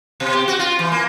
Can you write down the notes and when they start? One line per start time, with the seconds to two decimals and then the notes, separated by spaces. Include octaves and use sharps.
0.20 B2
0.34 G4
0.48 F#4
0.59 F4
0.79 E3
0.92 A#3